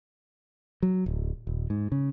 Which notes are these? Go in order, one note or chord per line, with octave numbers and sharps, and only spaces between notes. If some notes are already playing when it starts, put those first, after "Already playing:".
F#3
D1
D#1
G#2
C#3